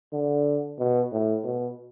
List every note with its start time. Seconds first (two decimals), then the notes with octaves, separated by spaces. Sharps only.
0.13 D3
0.79 B2
1.12 A2
1.44 B2